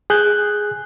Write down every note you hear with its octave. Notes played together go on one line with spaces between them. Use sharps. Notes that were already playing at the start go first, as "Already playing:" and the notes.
G#4 F#6 G6